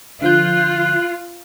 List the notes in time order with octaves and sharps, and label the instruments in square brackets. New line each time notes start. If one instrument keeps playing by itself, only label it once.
[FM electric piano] D3 F3 G6 [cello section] F4 [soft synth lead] F#6